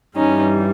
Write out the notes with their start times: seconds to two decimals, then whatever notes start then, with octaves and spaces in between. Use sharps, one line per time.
0.16 G2 E3 G3 C#4 D#4